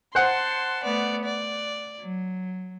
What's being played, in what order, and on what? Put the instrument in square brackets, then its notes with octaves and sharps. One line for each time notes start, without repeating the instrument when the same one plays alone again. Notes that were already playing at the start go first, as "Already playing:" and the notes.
[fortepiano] C5 F#5 [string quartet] A5 C6
[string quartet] A3 B3 D5
D5
F#3